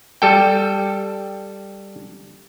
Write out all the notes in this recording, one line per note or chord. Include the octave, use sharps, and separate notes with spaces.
G3 A4 G5